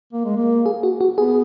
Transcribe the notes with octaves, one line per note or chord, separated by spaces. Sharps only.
A#3
G#3
A#3
G#4
F#4
F#4
B3 G#4